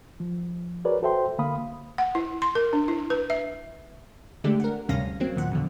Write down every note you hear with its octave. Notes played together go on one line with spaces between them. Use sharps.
F3
F#4 G#4 A#4 B4 C#5 D5
F#4 A4 C5 E5 G5 C6
D3 A#3 F5 B5 D#6
F#5
E4
C6
A#4
D4
E4
B4
E5
D3 G#3 A3 D4 G4
A#4 F#5
D2 G2 C3 C#4 F5 A#6
F#3 A#3 C4
D#2 A#2 F#5
F2 B2 D3